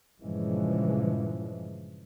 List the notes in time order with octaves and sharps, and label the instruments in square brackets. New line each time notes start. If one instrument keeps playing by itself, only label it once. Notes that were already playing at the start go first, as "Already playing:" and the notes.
[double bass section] G2 A#2 C#3 E3 F3 G#3